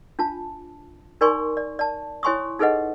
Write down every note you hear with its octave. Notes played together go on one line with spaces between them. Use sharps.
D4 F4 A5
D#4 A#4 D5 G#5 C6 C#6
D5
D5 A5
E4 C#5 G#5 C6 C#6 D#6
D#4 G#4 A4 B4 D#5 F#5